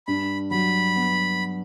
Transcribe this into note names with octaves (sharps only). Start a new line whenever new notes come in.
G2 B5
F#3 B5
B3